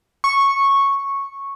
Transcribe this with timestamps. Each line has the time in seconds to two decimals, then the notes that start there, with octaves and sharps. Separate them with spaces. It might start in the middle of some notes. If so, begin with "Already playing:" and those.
0.24 C#6